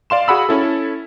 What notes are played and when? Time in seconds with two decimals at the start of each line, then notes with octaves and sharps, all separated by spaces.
0.10 D5 F5 C6 E7
0.28 F#4 G#4 F#5 B5 E6
0.49 C#4 E4 A4